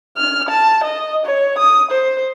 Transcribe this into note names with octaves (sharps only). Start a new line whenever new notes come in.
F6
A5
D#5
C#5
D#6
C5